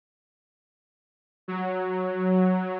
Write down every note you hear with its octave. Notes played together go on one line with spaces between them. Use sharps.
F#3